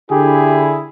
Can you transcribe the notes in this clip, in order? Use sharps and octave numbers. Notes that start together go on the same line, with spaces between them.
D3 E4 G4 G#4